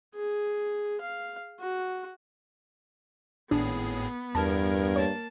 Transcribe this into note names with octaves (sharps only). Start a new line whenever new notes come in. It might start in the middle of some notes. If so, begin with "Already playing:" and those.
G#4
F5
F#4
G#1 A2 B3 D4 G#4
E2 G2 A#4 A5 G#6
A#3 C#5 A5